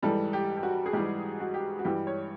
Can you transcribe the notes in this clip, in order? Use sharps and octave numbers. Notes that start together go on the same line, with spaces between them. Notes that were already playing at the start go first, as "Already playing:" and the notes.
G#2 E3 G3 A4
G4
G4
F#4
G#4
G#2 E3 G3 G4
F#4
G4
F#4
G2 E3 G3 G4
C#5